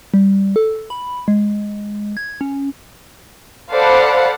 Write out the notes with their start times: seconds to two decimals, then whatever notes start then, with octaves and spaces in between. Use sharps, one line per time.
0.14 G3
0.56 A4
0.90 B5
1.28 G#3
2.17 G#6
2.41 C#4
3.70 A4 C5 D5 F5 F#5 B5